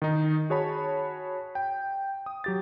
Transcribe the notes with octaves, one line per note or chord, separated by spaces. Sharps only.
D#3 D#4
F#4 G#4 C#5 A5 B5
G5
D#6
F#3 G4 A6